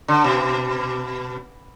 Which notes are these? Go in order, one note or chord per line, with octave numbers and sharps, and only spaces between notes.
D3
B2